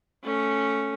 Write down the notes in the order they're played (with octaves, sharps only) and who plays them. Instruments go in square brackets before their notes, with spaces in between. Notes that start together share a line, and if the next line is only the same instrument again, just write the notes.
[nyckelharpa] A3 C#4